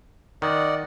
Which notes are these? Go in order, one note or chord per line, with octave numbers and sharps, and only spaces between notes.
D#3 D5 D#5 F#5